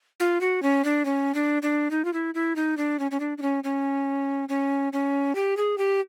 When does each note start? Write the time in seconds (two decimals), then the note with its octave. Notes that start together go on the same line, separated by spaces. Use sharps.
0.20 F4
0.41 F#4
0.63 C#4
0.84 D4
1.05 C#4
1.34 D4
1.62 D4
1.91 D#4
2.05 F4
2.13 E4
2.35 E4
2.56 D#4
2.77 D4
2.99 C#4
3.11 C#4
3.20 D4
3.38 D4
3.42 C#4
3.64 C#4
4.49 C#4
4.93 C#4
5.35 G4
5.57 G#4
5.78 G4